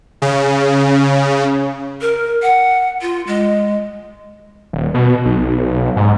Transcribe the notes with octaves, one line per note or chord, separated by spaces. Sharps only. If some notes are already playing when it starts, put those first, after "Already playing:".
C#3
A#4
F#5
F4
G#3
D#1
B2
B1
G#2